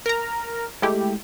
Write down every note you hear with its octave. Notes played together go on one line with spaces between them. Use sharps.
A#4 A#5
G#3 A3 E4 G4